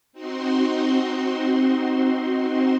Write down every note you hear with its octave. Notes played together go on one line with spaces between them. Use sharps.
C4 D#4 F#4 C6